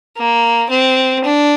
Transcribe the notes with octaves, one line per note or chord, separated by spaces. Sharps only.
A#3
C4
D4